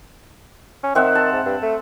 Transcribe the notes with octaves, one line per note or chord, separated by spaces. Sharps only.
C#4
D#3 C4 E5 F#5
A5
G#2
G2
A3